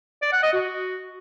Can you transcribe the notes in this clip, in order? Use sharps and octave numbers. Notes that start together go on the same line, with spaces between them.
D5
F#5
D#5
F#4